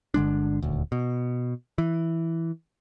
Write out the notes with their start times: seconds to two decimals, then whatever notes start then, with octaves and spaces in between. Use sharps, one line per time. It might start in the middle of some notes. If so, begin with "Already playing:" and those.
0.14 G1 D3 G#3 D4
0.62 D#1 D2
0.92 B2
1.78 E3